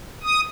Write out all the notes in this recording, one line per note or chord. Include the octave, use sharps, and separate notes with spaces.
D#6